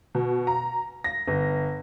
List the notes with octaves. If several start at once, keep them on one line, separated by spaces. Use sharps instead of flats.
B2
A#5
A#6
G1